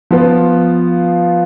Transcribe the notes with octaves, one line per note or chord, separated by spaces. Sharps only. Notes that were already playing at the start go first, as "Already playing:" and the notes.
F3 B3 F4